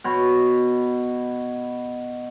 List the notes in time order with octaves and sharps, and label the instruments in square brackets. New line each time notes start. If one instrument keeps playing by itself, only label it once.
[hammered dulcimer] B2 C#5 B5 C#6